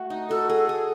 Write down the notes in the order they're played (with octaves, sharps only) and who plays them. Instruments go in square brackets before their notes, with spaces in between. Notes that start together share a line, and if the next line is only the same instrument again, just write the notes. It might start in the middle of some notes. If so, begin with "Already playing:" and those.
Already playing: [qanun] A3 F#4
D#4
[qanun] F#4 [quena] A4
[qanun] G#4
[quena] A4
[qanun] G#4